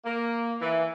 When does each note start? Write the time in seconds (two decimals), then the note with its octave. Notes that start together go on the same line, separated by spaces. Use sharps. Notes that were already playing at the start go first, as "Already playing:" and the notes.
0.05 A#3
0.61 E3